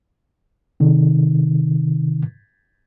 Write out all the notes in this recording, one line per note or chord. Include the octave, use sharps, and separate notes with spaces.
C3 D#3